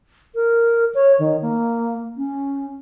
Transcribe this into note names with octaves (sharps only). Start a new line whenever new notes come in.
A#4
C#5
D#3
A#3
C#4